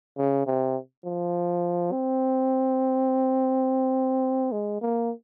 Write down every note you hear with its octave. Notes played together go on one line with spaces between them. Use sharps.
C#3
C3
F3
C4
G#3
A#3